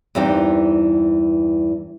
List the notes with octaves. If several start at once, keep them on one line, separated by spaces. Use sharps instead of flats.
E2 G2 E3 G3 C4 D#4